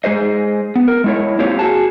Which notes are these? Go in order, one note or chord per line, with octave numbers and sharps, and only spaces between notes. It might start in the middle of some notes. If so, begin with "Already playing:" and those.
G#3 G#4 C5 D#5
B3
A#4
G#3 E4 C#5
A#3 C4 F4 G4 C#5
F#4 G#4 A5